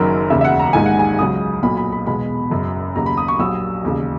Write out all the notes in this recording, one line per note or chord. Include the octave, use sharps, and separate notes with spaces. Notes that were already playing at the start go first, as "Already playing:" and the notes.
Already playing: F#1 F#2 D#3 F#3 A#4
E1 D#2 C#3 E5
E5
F#5
A#5
A#1 G#2 D#3 G#3 G#5
F#5
G#5
C#2 C#3 F#3 D#6
B1 A#2 F#3 B5
B5
B5
E2 B2 G#3 B5
F#1 F#2 C#3
D#2 C#3 F#3 A#5
B5
D#6
C#6
A#1 A#2 F#3 E6
E1 D#2 C#3